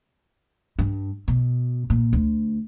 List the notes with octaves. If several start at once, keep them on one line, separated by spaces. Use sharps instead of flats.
G2
B2
A#2
D2